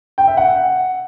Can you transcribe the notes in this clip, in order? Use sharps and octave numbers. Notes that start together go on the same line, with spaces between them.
G5
E5
F#5